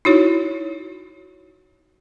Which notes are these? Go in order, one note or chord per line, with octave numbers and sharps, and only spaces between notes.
D#4 E4 F#4 C#5